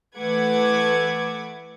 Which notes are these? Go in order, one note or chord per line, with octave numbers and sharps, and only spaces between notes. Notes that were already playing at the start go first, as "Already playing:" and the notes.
E3 A3 B4 F#5 D6 G#6